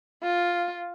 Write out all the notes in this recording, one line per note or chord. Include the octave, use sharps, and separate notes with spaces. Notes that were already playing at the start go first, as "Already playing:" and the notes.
F4